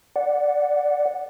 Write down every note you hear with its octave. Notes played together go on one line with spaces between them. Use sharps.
D5 F#5